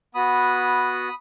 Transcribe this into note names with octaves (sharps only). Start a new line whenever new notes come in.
B3 F#4 B5 D#6